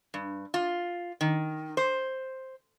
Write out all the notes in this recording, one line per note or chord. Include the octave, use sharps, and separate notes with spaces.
G2
F4
D#3
C5